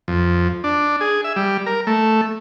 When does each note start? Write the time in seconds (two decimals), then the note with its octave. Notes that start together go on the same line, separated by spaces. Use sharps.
0.08 F2
0.64 D4
1.01 G#4
1.24 E5
1.36 G3
1.66 A#4
1.87 A3